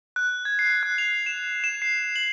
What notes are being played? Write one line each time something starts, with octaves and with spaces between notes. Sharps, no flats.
F#6
G#6
C7
F#6
F7
E7
E7
C7
F#7